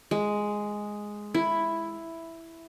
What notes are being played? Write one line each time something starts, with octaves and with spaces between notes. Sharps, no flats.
G#3
E4